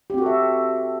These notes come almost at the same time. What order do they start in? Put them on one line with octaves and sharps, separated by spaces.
G4 C4 F#4 A4 E5